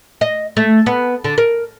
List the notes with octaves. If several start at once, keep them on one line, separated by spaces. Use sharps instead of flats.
D#5
A3
B3
D3
A#4